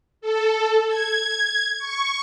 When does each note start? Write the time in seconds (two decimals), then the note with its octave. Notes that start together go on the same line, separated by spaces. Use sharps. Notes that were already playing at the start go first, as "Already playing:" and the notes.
0.21 A4
0.88 G#6
1.78 C#6